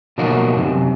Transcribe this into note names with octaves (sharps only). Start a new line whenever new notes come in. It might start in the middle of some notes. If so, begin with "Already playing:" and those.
B2 F3 F#3 A#3 D#4 F#4
F#2 C3